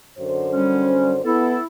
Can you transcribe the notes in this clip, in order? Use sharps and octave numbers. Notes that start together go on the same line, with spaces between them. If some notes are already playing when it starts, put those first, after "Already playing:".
F#2 D3 C5
G3 C#4
B3 E4 A4